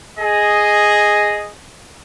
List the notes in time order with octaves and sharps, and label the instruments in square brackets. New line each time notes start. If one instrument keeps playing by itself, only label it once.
[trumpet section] G#4 D#5